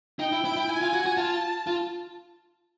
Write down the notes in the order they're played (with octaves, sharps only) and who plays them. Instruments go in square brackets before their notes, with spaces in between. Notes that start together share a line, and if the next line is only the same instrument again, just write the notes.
[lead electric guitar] D#4 [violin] G5
[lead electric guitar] E4
E4
E4
[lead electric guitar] E4 [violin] G#5
[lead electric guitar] F4
F#4
F#4
[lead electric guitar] F4 [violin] A5
[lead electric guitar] F4